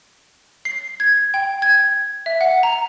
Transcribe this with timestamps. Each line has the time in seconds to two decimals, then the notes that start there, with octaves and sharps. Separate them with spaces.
0.65 C7
1.00 G#6
1.34 G5
1.62 G#6
2.26 E5
2.41 F#5
2.63 A#5